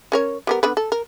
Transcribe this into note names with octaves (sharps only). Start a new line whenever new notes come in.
C#4 A#4 C#5
G3 B3 A#4
D3 B3 B4
A4
A#4